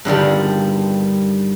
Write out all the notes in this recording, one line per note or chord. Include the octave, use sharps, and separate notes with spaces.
G2 D3 D#3 G3